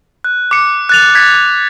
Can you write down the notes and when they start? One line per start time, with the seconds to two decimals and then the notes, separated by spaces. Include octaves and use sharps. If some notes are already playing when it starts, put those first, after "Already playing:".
0.24 F#6
0.51 D6 C#7
0.89 F#6 A6 F7
1.15 F#6 G#6 A6 B6